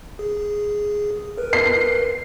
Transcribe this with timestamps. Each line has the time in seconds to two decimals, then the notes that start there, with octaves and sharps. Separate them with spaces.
0.19 G#4
1.38 A#4 B4
1.53 C7